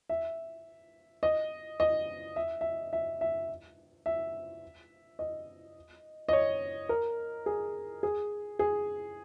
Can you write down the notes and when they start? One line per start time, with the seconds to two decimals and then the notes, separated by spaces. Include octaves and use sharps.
0.10 E5
1.23 D#5
1.80 D#5
2.36 E5
2.61 E5
2.93 E5
3.21 E5
4.06 E5
5.19 D#5
6.29 D#5
6.33 C#5
6.89 A#4
7.46 G#4
8.03 G#4
8.59 G#4